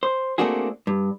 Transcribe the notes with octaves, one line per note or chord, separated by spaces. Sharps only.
C5
A3 A#3 C4 D4 F#4 G#4
G2